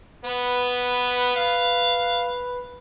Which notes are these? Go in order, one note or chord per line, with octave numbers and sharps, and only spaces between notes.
B3 B4
F5